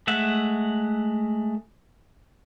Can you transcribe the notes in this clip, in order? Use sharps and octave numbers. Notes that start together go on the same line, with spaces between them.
G#3 A3 E5 F#5